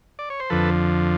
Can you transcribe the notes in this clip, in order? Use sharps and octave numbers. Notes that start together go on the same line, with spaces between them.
D5
C#5
C5
F2 D3 F3 A4 B4